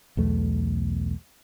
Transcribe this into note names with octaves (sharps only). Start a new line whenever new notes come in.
B1 E2 A3